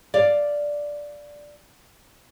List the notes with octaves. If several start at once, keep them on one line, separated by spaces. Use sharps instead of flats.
D5 F5